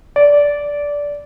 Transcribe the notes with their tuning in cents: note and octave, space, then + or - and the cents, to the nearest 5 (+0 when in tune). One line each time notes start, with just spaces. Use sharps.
D5 -15